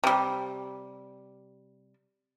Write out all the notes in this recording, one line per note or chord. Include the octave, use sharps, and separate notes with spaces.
C3 G3